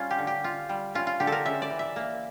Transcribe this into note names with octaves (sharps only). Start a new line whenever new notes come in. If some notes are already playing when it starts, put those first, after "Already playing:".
Already playing: G3 C#4 F4
G4
D3
G4
F4
G3
C#4 F4
F4
D3 G4
A4
A#4
C#3 E5
D5
E3
E5
A#3